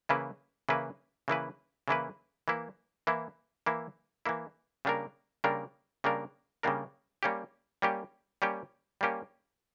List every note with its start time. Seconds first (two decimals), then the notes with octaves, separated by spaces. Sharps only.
0.09 C#3 E3 A#3 E4 B4
0.69 C#3 E3 A#3 E4 B4
1.28 C#3 E3 A#3 E4 B4
1.88 C#3 E3 A#3 E4 B4
2.48 E3 A#3 E4
3.07 E3 A#3 E4
3.66 E3 A#3 E4
4.26 E3 A#3 E4
4.85 C#3 G3 A#3 D4 A#4
5.44 C#3 G3 A#3 D4 A#4
6.04 C#3 G3 A#3 D4 A#4
6.63 C#3 G3 A#3 D4 A#4
7.23 G3 A#3 C#4 G4
7.82 G3 A#3 C#4 G4
8.42 G3 A#3 C#4 G4
9.01 G3 A#3 C#4 G4